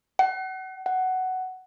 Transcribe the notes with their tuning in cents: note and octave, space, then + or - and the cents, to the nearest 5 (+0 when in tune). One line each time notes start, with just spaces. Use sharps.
F#5 +30
F#5 +10